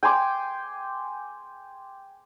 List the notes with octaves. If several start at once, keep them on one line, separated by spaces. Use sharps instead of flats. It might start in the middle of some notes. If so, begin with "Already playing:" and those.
G5 G#5 C6 D6